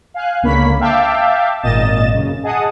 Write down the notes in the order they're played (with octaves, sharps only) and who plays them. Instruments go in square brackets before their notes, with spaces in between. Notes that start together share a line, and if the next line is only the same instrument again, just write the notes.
[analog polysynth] F5 G#5 F#6
C#2 D3 A#3 C#5 B5 B6
E5 F5 G5 A5 D6
G#1 A#2 D#5 A6 E7
F#2 C#3
G#4 D#5 F#5 A5 D#6